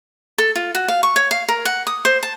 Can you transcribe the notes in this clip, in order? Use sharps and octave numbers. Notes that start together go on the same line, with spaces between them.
A4
F4
F#4
F5
C#6
C#5
F5
A#4
F#5
D#6
C5
A5